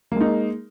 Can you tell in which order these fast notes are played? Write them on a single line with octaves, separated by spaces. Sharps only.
A#3 G#3 D#4